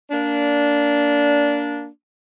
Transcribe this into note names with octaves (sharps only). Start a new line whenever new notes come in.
A#3 D4